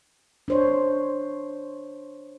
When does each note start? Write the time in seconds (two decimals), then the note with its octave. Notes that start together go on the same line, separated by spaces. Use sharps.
0.48 D4 C5 C#5